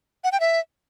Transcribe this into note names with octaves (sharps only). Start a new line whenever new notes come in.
F#5
G5
E5